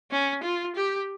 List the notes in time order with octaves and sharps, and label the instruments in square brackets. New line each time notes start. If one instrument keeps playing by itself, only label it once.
[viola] C#4
F4
G4